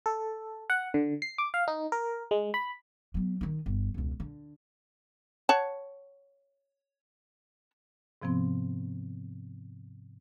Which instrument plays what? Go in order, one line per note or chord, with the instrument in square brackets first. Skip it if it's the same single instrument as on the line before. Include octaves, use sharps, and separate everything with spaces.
[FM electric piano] A4
F#5
D3
C7
D6
F5
D#4
A#4
G#3
B5
[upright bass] F#3 B3
D#3 D#4
G1
E1 C#2
D3
[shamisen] C#5 F#5 A5
[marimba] G#2 C3 F3 B3 C4